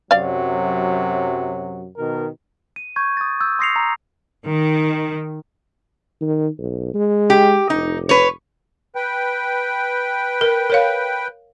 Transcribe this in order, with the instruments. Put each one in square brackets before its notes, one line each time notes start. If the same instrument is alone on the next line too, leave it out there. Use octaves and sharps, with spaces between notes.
[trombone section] F#2 C3 F#3 [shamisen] D5 F5
[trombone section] B2 D#3 A#4
[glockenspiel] D#7
C#6 G6 G#6
D#6 A6
E6 G6
C6 D#6 A#6 C7 C#7 F7
A#5
[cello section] D#3
[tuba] D#3
B1
G#3
[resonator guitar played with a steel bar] G4
[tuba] F1 [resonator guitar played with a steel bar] D#4
[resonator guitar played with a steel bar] B4 C#5
[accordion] B4 G5
[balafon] A#4
A#4 C#5 F5